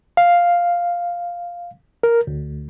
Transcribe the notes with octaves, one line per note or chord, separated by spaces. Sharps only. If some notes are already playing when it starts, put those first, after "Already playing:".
F5
A#4
D2